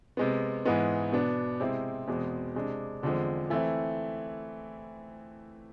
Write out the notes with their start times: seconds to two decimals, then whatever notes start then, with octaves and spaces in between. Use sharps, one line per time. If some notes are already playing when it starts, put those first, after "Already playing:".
0.17 C3 G#3 B3
0.65 G#2 E3 G#3 B3
1.12 B2 B3 D4
1.60 C3 G#3 C4 E4
2.07 E2 B2 G#3 C4
2.55 C3 G#3 D4
3.03 E2 D3 F3 G#3 C4
3.50 E3 A3 C4 E4